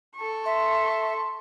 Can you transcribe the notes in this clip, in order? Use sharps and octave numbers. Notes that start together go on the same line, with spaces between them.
A4 C#6
E5 C6